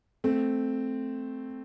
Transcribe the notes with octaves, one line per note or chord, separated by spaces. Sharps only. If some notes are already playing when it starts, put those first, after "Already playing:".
A3 C4